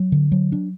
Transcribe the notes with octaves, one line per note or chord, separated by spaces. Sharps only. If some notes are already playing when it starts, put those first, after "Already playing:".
Already playing: F#3
D3
F#3
D4